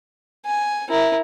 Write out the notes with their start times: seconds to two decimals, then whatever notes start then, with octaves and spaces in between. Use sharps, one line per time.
0.46 G#5
0.90 E4 A#4